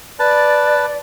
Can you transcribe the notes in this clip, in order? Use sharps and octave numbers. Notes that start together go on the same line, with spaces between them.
B4 D5 A5